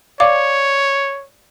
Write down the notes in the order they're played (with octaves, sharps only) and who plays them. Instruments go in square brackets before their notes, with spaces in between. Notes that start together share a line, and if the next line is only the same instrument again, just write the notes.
[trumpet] C#5 [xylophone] D5 F5 D6